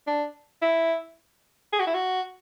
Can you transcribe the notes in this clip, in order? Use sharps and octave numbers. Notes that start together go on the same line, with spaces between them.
D4
E4
G#4
F#4
E4
F#4